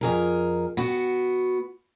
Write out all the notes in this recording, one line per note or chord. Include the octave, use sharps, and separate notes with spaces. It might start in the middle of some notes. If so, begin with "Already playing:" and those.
F2 G#4 A#4
B3 F#4